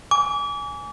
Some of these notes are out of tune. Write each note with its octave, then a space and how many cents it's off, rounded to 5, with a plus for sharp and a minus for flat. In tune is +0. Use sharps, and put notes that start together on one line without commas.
G#5 +0 D6 -35